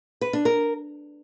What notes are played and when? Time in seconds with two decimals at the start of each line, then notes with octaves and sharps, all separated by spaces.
0.21 B4
0.33 D4
0.45 A#4